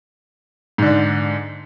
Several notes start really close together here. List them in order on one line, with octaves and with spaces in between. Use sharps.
G#2 D3 D4